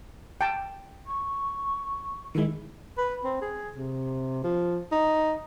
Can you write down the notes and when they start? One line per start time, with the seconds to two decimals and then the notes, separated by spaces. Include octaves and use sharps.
0.41 G5 A5
1.06 C#6
2.35 D#3 G#3 E4
2.98 B4
3.24 C4
3.42 G#4
3.76 C3
4.44 F3
4.92 D#4